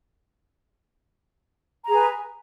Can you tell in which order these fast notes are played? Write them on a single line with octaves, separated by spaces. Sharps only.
A#5 G#4 B4